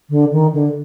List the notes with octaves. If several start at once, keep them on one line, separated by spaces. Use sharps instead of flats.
D3
D#3
D3